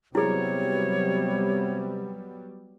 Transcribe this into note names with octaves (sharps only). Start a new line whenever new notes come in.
C3 F#3 G3 B3 E4 G#4 C#5